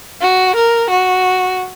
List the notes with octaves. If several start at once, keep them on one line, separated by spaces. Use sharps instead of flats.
F#4
A#4
F#4